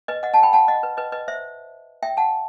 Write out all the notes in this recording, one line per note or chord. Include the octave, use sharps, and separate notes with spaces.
B4 D#5
D#5 F#5
F#5 A5
G5 B5
F#5 A5
D#5 F#5
B4
B4 D#5
B4 D#5
C5 E5
E5 G5
F#5 A5